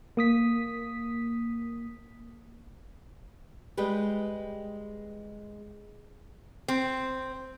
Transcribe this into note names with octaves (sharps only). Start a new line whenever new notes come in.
A#3 D#6 B6
G3 G#3 G4 B4
C4